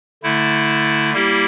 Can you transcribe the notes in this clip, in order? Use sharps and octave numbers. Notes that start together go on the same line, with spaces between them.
D3 A3 E4
G3 A#3 E4 G4